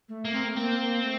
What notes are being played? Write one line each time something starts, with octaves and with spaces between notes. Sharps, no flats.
A3
A#3
C4
A3
A#3 C4
A#3
A3